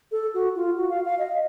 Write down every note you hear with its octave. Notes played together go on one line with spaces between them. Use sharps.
A4
F#4
F4
F#4
F5
F5
D#5